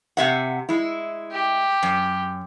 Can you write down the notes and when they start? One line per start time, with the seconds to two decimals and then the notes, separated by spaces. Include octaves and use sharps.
0.17 C3 E5 F#5
0.69 G#3 E4
1.32 G4
1.83 F#2